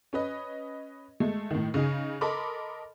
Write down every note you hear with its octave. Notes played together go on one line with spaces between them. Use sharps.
C#4 B4 D#5
G#3 A3
A2 D#3
C#3 D#4 G#4
A4 A#4 D#5 B5 C6 D6